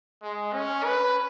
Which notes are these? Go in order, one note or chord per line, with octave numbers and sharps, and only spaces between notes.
G#3
C#4
B4